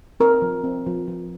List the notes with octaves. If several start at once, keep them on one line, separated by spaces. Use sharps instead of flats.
C4 A#4
F3
C4
F3
F3